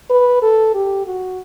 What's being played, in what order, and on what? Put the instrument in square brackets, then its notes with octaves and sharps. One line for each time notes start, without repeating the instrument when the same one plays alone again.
[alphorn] B4
A4
G4
F#4